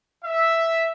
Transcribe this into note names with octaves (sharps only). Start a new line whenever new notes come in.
E5